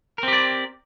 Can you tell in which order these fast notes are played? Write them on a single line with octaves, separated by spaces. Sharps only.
A#4 C4 G4 D5